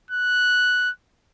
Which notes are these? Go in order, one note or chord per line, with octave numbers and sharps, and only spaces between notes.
F#6